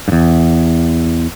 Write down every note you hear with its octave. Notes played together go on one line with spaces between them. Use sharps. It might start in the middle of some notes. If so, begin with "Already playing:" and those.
E2 G2